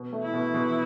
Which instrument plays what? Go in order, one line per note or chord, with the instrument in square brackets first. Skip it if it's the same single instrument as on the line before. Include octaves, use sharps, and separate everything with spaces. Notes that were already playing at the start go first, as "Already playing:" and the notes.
Already playing: [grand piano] B2
A3
[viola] E4
[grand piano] B2
B2